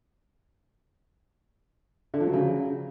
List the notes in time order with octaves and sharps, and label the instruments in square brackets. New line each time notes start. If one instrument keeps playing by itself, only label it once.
[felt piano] D3
F3
F#3
C#3